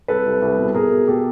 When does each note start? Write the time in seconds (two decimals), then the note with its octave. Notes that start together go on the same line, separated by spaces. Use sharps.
0.08 C2 A4 B4
0.26 C2
0.42 C2
0.58 B2
0.74 B2 G#4 A#4
0.91 B2
1.07 B2 G4 A4